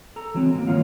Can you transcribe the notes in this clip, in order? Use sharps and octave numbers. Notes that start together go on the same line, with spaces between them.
A4 A#5
E3 F#3 G#3 C4
A2 A#3
G2 D#3 A#3 F4 C#5 F5